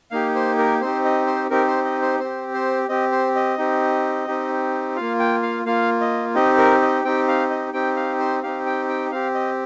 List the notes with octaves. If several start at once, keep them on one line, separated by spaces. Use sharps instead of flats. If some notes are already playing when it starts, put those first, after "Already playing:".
A#3 D#4 G4 F5
C5
A#4
C4 D#4 G4 C5
D#5
C5
C4 D#4 G4 A#4
C5
D#5
C5
C4 G4 C5
C5
C4 G4 D#5
C5
D#5
C4 D#4 G4
C4 D#4 G4
A#3 F4 F5
G5
F5
A#3 F4 F5
D#5
C4 D#4 G4 D#5
A#4
D#5
C4 D#4 G4 G5
F5
D#5
C4 D#4 G4 G5
F5
C5
C4 D#4 G4 F5
G5
G5
C4 G4 F5
D#5